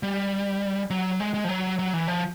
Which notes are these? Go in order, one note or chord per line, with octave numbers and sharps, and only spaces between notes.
G3
F#3
G#3
G#3
F3
F#3
F#3
E3
F3